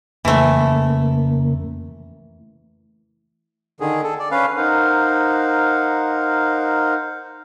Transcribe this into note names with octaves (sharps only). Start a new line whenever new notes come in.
F2 C#3 E3 A3 A#3
D3 D#3 G#4
A4
D5
C#4 B4 F5
D#4 A#4 C5 F5 F#5